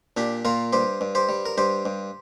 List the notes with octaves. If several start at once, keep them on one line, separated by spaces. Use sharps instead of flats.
A#2 D4 G4
A#2 F4 A#4
G2 G4 C5
G2
G4 C5
G3
A#4
G2 G4 C5
G2